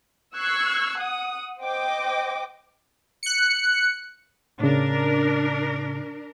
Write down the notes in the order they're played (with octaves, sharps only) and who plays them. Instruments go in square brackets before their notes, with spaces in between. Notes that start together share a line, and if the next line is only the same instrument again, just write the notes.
[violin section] C#6 E6 F#6 G#6 C7
F#5 D#6
C5 D#5 G5 D6
[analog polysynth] F#6 C#7
[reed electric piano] A2 C#3 [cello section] D4 A#4